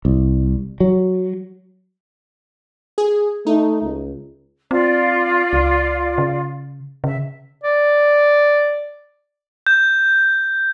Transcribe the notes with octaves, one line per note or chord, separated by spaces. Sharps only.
C2
F#3
G#4
A3 D#4
C#2
C4 F4 D5 F5
C#2
C#3
C#3 E5
D5
G6